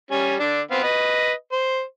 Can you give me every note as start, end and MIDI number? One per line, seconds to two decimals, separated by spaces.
0.11 0.35 55
0.11 0.35 61
0.11 0.35 80
0.40 0.61 50
0.40 0.61 62
0.71 0.82 59
0.71 0.82 60
0.71 0.82 77
0.83 1.32 71
0.83 1.32 75
1.52 1.83 72